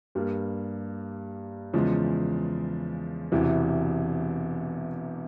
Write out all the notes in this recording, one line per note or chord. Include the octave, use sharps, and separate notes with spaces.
G2 G3 A#3
E2 C#3 F3 G#3
E1 E2 C3 E3